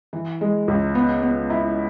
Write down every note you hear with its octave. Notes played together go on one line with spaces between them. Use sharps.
E3
G#3
C#2
B3
B3
E4